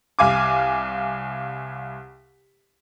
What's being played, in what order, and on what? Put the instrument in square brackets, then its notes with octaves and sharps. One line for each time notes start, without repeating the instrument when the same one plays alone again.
[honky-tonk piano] C2 F5 G#5 D6